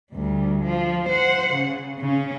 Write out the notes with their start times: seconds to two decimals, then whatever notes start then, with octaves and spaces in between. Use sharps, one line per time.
0.12 D2 G3
0.63 F3
1.08 C5 F#5
1.53 C#3
1.99 C#3 C#4